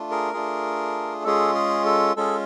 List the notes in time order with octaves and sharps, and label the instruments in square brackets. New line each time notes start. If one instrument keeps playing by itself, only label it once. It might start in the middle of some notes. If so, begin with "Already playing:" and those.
Already playing: [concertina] A3 D4 F4
G#4 A#4
A3 D4 F4 G#4
G#3 C#4 F4 G#4 A4
G#4
A4
G#3 C#4 F4 G#4 A4